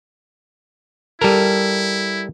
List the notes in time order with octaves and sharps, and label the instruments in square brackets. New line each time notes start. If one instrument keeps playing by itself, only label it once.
[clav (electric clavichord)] G3 A4 A#4 [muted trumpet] E4